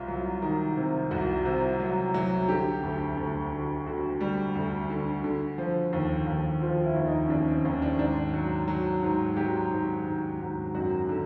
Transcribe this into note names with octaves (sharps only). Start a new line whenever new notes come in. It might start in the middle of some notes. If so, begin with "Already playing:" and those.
Already playing: C2 F4
F#3
D#3
C3
C2 F#4
C3
F#3
F#3
D3 G4
D2
D2
D3
D3 F#4
G3
D2
D3
D3
F3
D#2
D#2
F3 F4
E4
D#2
D#4
C#4
D#2 D4
C4
D#2 C#4
D4
G#2 D4
F#3
F#3
G#2
F#3 G4
G#2
G#2
G#2
F#2 F#4
D3